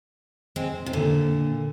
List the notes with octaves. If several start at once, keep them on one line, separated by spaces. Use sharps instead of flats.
G#3 C4
C3
A#2 D3